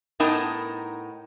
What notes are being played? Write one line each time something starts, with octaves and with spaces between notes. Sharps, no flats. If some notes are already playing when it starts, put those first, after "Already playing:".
A2 B3 D#4 A#4 G5 A5